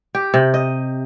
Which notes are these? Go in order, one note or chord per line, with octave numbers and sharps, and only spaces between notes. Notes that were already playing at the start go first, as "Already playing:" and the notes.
G4
C3
D#5